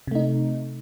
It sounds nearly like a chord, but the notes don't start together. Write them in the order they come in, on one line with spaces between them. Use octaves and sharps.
C3 A3 D#4